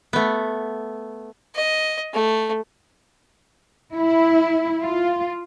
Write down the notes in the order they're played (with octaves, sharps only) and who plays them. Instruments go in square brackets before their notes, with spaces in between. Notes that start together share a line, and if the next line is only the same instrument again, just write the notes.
[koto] A3 B3
[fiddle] D#5
A3
[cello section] E4
F4